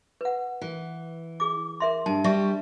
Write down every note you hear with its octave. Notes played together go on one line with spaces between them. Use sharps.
B4 F#5
E3
G#4 D6
A#4 E5 C6
G2 A5
G3 E5 C#6